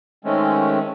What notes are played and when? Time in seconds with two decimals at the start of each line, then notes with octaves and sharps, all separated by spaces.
0.25 D#3 G#3 A3 C4 C#4